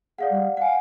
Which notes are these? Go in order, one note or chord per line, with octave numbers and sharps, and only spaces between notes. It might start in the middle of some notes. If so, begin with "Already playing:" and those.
G#4 D5 F5 F#5
G3
F5 F#5 G#5